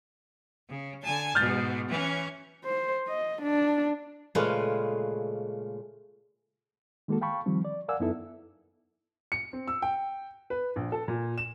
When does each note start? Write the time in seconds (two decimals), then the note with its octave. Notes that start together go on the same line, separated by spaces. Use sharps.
0.69 C#3
1.02 D3 G#5 A5
1.35 G#2 B2 F6 G6 A6
1.88 E3 C#4
2.65 C5
3.08 D#5
3.43 D4
4.35 A#2 C#3 G#3 A3 B4 F5
7.08 D#3 G#3 A#3 F#4 A4
7.21 F5 G5 A5 B5 C#6
7.46 D#3 F3 G3 C4
7.65 D5
7.88 A#4 D5 F5 F#5 G#5 E6
8.00 F#2 B3 D#4 E4 A4 E5
9.32 C#7
9.53 C4
9.68 E6
9.82 G5
10.50 B4
10.76 A#1
10.92 A4
11.08 A#2
11.38 E7